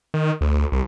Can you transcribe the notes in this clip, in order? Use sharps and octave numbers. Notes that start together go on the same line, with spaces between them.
D#3
D2
C2